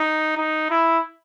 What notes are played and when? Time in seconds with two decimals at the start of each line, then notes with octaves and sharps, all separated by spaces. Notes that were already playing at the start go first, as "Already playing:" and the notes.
Already playing: D#4
0.37 D#4
0.70 E4